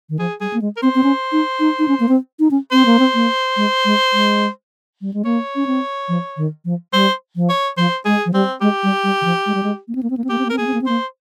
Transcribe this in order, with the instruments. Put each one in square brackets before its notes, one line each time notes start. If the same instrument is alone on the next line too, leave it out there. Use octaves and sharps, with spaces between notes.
[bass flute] D#3
[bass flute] F3 [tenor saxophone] G#4
[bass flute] G3 [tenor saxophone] G#4
[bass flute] A#3
G#3
[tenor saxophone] A#4
[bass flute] C4 [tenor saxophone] C5
[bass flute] C4
C#4
D#4
D#4
D#4
C#4
A#3
C4
D#4
C#4
[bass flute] C4 [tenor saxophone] C5
[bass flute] A#3
C4
A#3
G#3
G#3
G#3
G3
G#3
[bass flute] A#3 [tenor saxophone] C#5
[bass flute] C#4
C4
F3
D#3
F3
[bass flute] G3 [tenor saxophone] C5
[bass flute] F3
[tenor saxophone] C#5
[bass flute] F3 [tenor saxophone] C5
[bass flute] G#3 [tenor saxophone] G#4
[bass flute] F3
[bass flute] G3 [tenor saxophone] C4
[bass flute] G#3 [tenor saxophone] G4
[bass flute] G3
G3
D#3
F3
G#3
G3
G#3
A#3
C4
A#3
C4
A#3
C4
[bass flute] A#3 [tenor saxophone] G4
[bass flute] C4
A#3
[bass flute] C4 [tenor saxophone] A#4
[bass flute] A#3 [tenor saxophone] G#4
[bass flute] C4
A#3
C4
[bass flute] A#3 [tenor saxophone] C5